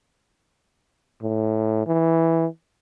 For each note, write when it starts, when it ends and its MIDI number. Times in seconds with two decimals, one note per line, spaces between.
1.22 1.85 45
1.87 2.46 52